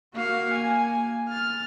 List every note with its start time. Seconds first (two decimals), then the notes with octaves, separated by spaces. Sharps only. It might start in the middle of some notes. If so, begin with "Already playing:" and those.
0.14 A#3 F#4 F5
0.54 G#5
1.29 F6 A6